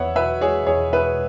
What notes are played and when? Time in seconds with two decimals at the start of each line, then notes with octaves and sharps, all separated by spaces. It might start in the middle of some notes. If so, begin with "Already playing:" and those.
Already playing: E2 B3 C#5 E5 F#5
0.15 B2 B4 E5
0.41 G#3 G#4 C#5
0.67 E2 G#4 C#5
0.93 B3 B4 E5